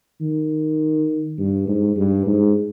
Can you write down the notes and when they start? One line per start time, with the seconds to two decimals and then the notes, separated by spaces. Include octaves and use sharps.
0.21 D#3
1.38 G2
1.68 G#2
1.96 G2
2.27 G#2